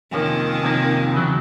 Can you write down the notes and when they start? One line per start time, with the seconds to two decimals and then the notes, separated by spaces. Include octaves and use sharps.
0.12 F2 C3 D#3 F3 A#3 C#4
0.62 F2 C3 F3 A#3 C#4
1.13 E2 C#3 F#3